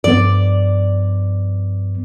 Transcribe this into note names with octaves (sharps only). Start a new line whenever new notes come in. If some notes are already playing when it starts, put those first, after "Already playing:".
G2 F3 B3 D5